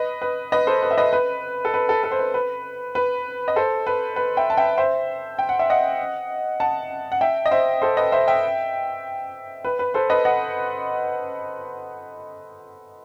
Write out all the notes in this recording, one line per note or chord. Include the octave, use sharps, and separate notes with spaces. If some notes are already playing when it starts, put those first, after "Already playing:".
Already playing: B4 D#5
B4
B4 D#5
A4 C5
B4
E5
B4 D#5
B4
A4
B4
A4
A4
C5
B4
B4
B4
D#5
A4 C5
B4
B4
E5 G5
A5
E5 G5
C5 E5
G5
F#5
E5
D#5 F#5
F#5 A5
F#5
E5 G5
D#5
C5 E5
A4 C5
B4 D#5
C5 E5
E5 G5
B4
B4
A4 C5
B4 D#5
D#5 F#5